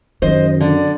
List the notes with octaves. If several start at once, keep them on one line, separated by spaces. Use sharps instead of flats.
F#2 D#3 C5 D#5
D3 D5